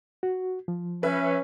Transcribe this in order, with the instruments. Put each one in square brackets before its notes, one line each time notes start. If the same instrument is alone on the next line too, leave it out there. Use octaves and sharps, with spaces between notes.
[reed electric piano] F#4
F3
[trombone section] C#4 [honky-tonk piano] B4 E5